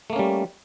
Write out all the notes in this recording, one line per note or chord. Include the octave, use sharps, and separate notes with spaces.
G3 A3 A#3 C#4